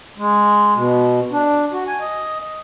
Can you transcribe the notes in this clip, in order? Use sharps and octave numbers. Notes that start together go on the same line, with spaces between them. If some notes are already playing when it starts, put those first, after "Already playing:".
G#3
B2
D4
F#4
G#5
D#5